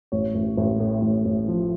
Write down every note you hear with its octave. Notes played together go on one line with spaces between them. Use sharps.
A1 C#5
A1
A1
A2
A1
A1
F3